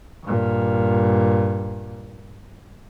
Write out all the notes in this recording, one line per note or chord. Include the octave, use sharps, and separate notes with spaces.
G2 A#2